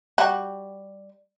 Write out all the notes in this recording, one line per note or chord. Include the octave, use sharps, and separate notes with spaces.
G3 F#4